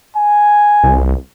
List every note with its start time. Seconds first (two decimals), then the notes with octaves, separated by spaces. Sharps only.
0.17 G#5
0.84 C2